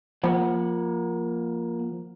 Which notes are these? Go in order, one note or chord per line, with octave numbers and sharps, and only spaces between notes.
F3 A#3 F#5